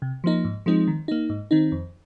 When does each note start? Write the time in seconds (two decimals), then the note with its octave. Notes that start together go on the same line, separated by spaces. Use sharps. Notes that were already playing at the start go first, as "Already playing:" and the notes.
0.02 C3
0.24 F3 A#3 D#4
0.44 G#2
0.66 F3 G#3 C4 D#4
0.87 D#3
1.08 A#3 D#4
1.30 G#2
1.51 D#3 C4 D#4
1.72 F2